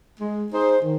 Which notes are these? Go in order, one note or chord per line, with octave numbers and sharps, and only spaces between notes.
G#3
D#4 G#4 C5
D#3